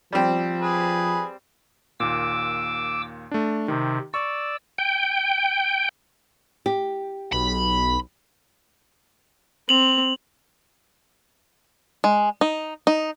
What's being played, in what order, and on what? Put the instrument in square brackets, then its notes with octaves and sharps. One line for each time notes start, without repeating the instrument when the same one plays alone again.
[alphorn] F3 [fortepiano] G3 C4
[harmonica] G#4 B4
[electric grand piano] D#2 A#2 [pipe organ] D6 E6
[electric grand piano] A3 D4
[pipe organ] C3 [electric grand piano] D#3
[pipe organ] D5 E6 [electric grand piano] C#6
[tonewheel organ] G5
[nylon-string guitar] G4
[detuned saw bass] B1 [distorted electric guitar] B5
[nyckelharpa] C4 [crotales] F7 F#7
[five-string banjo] G#3
D#4
D#4